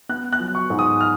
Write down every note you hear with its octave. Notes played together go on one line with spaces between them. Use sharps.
B3 F#6
F#6
F#3
C#6
G#2
D#6
F6